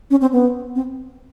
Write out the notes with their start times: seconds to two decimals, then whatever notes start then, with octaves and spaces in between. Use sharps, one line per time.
0.11 C#4
0.21 C4
0.33 B3
0.75 C4